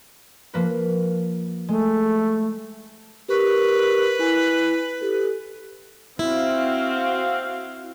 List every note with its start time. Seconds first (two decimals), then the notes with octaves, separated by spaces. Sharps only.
0.54 F3 A#3 B4
1.68 G#3 A3
3.29 G4 A#4 B4 C#6
4.19 E4 G#5
5.01 G4 A4
6.19 C4 E4 F#4 F5